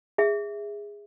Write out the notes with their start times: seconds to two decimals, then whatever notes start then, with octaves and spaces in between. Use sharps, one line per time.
0.18 G#4 E5